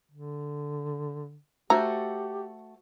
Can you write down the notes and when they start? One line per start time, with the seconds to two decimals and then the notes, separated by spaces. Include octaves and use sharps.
0.11 D3
1.70 A3 F#4 G4 C5 A#5